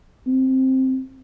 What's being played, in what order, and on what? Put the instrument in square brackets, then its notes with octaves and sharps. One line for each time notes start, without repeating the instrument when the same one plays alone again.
[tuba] C4